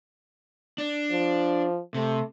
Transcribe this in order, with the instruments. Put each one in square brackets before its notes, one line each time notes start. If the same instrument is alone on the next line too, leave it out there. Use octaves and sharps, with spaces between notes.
[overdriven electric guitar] D4
[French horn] F3
[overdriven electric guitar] C3 [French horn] A3